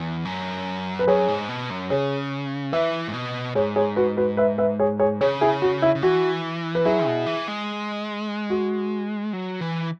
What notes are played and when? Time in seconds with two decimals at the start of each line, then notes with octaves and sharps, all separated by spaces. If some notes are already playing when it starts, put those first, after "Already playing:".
Already playing: E2
0.25 F#2
0.99 B4
1.07 F#2 G#4 C#5
1.28 G#2
1.49 B2
1.70 F#2
1.90 C#3 G#4 C#5
2.72 E3 B4 E5
3.08 G#2
3.14 B2
3.55 G#2 G#4 C#5
3.76 G#4 C#5
3.96 F#4 B4
4.17 F#4 B4
4.37 B4 E5
4.58 B4 E5
4.79 G#4 C#5
5.00 G#4 C#5
5.21 C#3 G#4 C#5
5.41 E4 G#4
5.62 F#4
5.82 E4
5.95 C#3
6.02 E3 F#4
6.75 B4
6.85 F#3 E4 G#4
7.06 B2
7.26 E3
7.48 G#3
8.50 F#4
9.33 F#3
9.61 E3